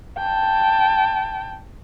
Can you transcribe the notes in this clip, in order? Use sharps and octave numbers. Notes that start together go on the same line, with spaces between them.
G5 A5